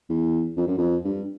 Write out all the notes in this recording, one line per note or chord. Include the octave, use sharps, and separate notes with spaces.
E2
F2
F#2
F2
G2